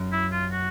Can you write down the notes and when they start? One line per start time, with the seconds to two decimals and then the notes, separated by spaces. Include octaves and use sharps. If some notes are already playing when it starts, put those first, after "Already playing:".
Already playing: F#2
0.12 E4
0.32 F4
0.52 F#4